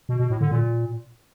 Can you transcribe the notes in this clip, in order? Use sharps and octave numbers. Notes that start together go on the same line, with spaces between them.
B2
B2
A2
D3
A#2